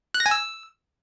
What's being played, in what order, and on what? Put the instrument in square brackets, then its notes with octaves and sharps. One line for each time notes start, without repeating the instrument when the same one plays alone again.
[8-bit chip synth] F#6
A#6
G#5
E6